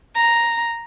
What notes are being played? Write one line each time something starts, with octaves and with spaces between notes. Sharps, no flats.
A#5